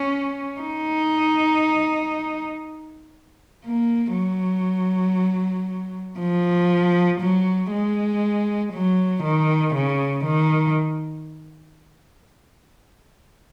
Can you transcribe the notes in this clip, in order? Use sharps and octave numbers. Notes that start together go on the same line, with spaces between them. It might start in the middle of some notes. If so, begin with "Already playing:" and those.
Already playing: C#4
D#4
A#3
F#3
F3
F#3
G#3
F#3
D#3
C#3
D#3